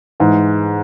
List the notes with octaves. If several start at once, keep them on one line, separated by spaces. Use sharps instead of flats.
G#2 E3 G#3